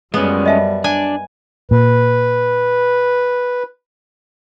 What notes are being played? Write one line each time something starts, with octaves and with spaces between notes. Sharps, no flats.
F#2 G3 G#3 B3 C#4
D#5 E5 A5
D4 G#5
A#2 B4